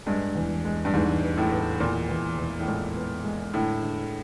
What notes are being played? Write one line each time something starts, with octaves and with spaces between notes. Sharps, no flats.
G2 G#3
E2
G#3
G2
E2 G#2
B3
A2
B3
E2 A#2
E2
E2
A2
A#2 G#3
B3
G#3
A2 D3
D3